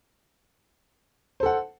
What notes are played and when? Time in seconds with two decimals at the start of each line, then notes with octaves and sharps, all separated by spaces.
1.40 C5
1.43 A4
1.46 F#5